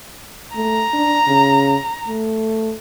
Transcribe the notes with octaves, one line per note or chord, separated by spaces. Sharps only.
A3 A#5
D4
C#3
A3